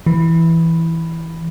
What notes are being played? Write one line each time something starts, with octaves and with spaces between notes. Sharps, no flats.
E3